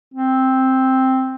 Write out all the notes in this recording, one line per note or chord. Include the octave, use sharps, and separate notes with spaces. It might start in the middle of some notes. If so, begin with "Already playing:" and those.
C4